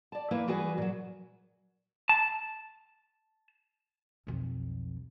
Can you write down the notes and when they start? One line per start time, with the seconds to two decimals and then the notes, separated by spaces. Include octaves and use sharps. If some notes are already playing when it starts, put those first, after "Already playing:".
0.12 D5 A5
0.31 E3 A#3 E4 B4
0.47 E3 G3 F#4 G#4 B4 G#5
0.78 A#2 F#3
2.09 A5
4.27 B1 F2